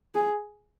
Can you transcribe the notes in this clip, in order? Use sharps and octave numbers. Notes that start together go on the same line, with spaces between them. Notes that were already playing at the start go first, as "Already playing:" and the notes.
G#4